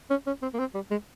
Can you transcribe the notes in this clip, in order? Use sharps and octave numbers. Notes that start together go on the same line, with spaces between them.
C#4
C#4
C4
A#3
C4
G3
G#3